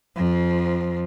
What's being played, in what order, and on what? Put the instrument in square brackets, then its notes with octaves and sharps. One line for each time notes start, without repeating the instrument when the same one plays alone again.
[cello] F2 F3